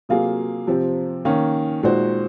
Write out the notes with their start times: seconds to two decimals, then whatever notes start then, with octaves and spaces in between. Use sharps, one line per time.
0.09 C3 F#3 A#3 F4 G#4
0.67 C3 F3 C4
1.25 D#3 A#3 C#4
1.83 A#2 G#3 D#4 F#4 C5